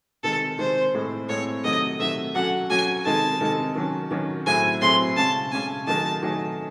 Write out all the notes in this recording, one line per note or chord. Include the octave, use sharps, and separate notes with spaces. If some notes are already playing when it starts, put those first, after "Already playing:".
C3 D#3 G#3 A4
C3 D#3 G#3 C5
A2 G#3 C4
A2 G#3 C4 C#5
C3 D#3 F#3 A3 D#5
C3 D#3 F#3 A3 E5
F#3 C#4 F#4 A4 F#5
F#3 C#4 F#4 A4 G#5
C3 D#3 G#3 D#4 A4 A5
C3 D#3 G#3 D#4 A4
D#3 F#3 C#4
D#3 F#3 C#4
A2 F#3 C4 E4 G#4 G#5
A2 F#3 C4 E4 G#4 C6
C#3 G#3 C#4 A5
C#3 G#3 C#4 G#5
D#3 F#3 A3 D#4 G#4 A5
D#3 F#3 A3 D#4 G#4